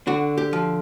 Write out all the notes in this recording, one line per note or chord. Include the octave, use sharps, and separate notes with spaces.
D3 F#4
G4
F3